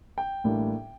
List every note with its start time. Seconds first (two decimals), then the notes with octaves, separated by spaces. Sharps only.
0.18 G5
0.44 A1 A2 G3 A#3 D4